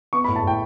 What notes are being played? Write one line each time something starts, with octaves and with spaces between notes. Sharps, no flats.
B3 C#6
B5
A2
A5
A2 G5